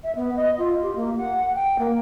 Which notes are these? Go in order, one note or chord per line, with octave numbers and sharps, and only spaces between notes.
E5
B3
D#5
F4
G4
A#3
F#5
G5
A#3